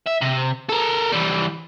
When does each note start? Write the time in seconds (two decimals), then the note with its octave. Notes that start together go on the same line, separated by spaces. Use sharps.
0.07 E5
0.22 C3
0.69 A4 A#4
1.12 E3 G3